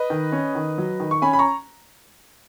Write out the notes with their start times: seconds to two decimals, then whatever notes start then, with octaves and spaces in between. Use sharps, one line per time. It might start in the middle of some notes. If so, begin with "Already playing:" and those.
Already playing: B4 D#5
0.10 D#3
0.32 C#4
0.55 D#3
0.78 F#3
1.00 D#3
1.11 C#6
1.22 C#4 G#5 B5
1.33 B5
1.39 A#5 C#6